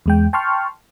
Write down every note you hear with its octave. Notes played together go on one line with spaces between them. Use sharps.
E2 G#3 G5
G5 A5 C6 C#6 F6